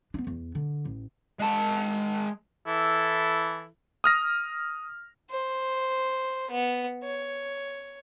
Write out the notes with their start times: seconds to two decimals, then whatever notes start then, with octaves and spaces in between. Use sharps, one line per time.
0.14 B3 D4
0.27 E2
0.55 D3
0.85 A1
1.39 G#3 A5
2.66 E3 E4 A4
4.04 D#6 F6 A#6
5.30 C5
6.50 B3
7.03 C#5